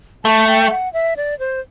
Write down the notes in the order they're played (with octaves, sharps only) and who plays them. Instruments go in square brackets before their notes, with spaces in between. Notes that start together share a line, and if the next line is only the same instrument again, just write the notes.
[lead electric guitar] A3 [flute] A5
[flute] G5
F#5
E5
D5
C5